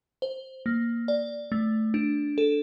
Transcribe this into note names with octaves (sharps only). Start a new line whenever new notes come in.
C5
A#3
D5
A3
D4
A4